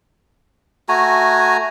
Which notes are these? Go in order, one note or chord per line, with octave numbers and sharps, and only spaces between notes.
A3 F#4 G#5 A#5